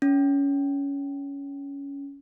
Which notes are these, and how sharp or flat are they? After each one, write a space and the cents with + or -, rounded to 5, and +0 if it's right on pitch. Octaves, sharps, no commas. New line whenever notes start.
C#4 +15